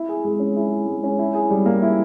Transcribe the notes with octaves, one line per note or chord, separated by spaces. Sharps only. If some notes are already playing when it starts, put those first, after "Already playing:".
Already playing: E4
G#4
G#3
C#4
E4
G#4
G#3
C#4
E4
G#4
G3
A#3
E4